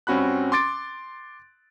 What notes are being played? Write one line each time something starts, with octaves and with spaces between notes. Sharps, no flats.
G2 C4 C#4 F#4 B5 F#6
C6 D6 A6 D7